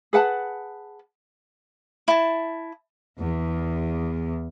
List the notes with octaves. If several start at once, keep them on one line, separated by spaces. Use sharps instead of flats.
G#4 B4 F#5 A5
E4 A5
E2